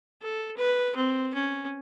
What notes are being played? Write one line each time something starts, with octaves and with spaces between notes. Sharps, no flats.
A4
B4
C4
C#4